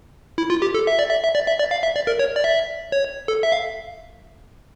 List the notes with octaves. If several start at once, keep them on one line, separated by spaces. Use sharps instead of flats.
E4
F4
G4
A4
E5
D5
E5
E5
D5
E5
D5
F5
E5
D5
A#4
C#5
D5
E5
C#5
A4
E5
F5